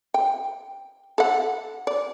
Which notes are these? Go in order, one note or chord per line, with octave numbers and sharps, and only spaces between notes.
G5
A4 F#5
D5